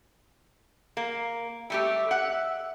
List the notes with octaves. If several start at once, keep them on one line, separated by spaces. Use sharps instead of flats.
A#3
G3 A3 G4 E5
F#5